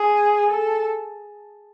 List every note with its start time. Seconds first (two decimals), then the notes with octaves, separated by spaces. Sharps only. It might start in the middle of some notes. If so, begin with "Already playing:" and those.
Already playing: G#4
0.51 A4